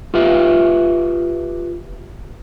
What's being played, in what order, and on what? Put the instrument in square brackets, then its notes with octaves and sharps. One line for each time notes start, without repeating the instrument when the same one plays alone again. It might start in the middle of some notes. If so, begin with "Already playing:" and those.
[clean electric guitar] F4 G4 B4 E5